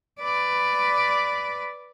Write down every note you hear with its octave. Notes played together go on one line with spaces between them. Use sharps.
B4 D5